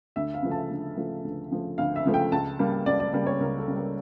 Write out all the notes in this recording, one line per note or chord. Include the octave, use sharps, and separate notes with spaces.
D2 E5
F5
C#3 F3 A3
A5
D2
C#3 F3 A3
D2
C#3 F3 A3
D2 F5
E5
C#3 F3 A3
G5
C#2 A5
C#3 G3 A#3
C#2 D5
D5
C#3 G3 A#3 D5
C#5
C#2 A#4
A4
C#3 G3 A#3
A#4